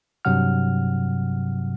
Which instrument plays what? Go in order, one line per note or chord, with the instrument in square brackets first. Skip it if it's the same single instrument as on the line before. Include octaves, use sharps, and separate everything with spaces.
[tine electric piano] G2 C3 F#3 F#5 F6